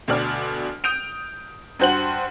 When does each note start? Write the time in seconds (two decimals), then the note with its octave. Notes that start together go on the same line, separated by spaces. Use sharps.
0.08 D2 B2 D5 F6
0.84 D#6 G6 D7 F7
1.79 G2 F#4 C5 F#5 F#7